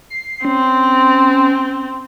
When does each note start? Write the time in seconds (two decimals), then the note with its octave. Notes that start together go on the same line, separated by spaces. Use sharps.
0.10 C7
0.45 C4 C#4